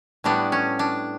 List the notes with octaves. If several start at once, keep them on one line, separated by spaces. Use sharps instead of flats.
A2 G3 B3 D4
C#4
D4